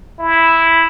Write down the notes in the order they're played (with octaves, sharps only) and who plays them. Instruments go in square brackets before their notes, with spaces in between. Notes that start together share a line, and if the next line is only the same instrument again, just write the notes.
[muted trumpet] E4